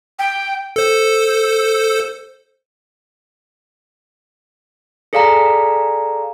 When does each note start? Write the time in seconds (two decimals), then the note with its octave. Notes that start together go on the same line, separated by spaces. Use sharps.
0.19 G5
0.76 A4 C5
5.13 G#4 A4 D5 F5 G#5 A#5